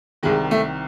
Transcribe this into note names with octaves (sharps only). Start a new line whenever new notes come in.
C2 C3 D#3 G#3
A3